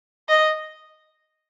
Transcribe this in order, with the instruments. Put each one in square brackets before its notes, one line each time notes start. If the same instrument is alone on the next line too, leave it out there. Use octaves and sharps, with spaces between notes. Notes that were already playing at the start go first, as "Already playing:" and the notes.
[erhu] D#5